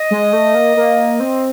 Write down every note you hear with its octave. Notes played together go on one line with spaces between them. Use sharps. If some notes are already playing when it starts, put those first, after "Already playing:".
Already playing: D#5
G#3
A3
A#3
A#3
C4